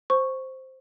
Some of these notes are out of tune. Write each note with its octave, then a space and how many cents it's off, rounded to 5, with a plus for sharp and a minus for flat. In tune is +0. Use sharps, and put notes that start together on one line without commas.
C5 +0 C#6 -5